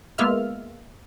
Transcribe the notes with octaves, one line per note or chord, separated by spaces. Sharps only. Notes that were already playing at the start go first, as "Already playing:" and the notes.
G#3 A#3 B3 F4 E5 F6